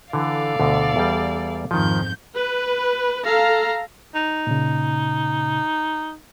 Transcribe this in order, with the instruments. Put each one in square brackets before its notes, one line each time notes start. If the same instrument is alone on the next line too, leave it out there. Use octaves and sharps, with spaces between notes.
[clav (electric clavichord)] D3 E3 [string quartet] A4 D5 F5
[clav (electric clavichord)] D2 B2 D3
E2 G3
[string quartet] F2 G#2 G6 [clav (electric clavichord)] D#3 F3
[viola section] B4
A4 F5 A#5
[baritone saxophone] D#4
[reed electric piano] A#2 C#3